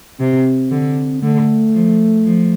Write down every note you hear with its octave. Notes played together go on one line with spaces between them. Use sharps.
C3 C4
D3
D3 A3
F3
F3